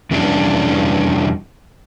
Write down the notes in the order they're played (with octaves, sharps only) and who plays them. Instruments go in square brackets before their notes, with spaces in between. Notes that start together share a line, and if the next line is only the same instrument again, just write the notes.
[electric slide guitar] F2 C3 E3 G3 C#4 D4